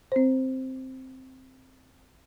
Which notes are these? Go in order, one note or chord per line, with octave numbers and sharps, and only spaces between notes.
C4 C5